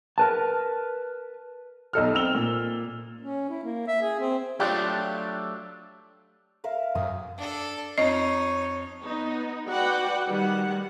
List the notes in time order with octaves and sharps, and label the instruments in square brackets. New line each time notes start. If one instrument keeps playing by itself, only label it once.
[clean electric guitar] A#4 B4 A5
[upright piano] B1 D#4 A4 F6
C4 E6 F7 G7
A#2
[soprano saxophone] C#4
E4
A#3
E5
G#4
C4
[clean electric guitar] F#3 A3 D4 [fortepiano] F4 G4 D5
[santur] A#4 E5 F5
[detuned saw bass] F#2 [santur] D#6
[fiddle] D4 A4
[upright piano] F2 [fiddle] D#4 [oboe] C#5 [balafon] D#5
[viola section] B3 D#4
F#4 B4 D5 F#5 G5
D#3 G3 F#5